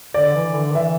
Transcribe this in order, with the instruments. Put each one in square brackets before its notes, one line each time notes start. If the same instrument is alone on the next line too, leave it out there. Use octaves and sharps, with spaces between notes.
[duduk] D3 [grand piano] D5
[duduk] E3
D3
[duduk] E3 [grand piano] E5